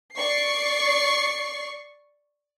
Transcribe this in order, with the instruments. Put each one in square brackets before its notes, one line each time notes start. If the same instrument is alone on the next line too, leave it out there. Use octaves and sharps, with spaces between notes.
[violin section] D5 C#6 C7